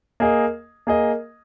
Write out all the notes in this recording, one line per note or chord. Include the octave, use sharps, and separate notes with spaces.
A#3 G#4 D#5
A#3 G#4 D#5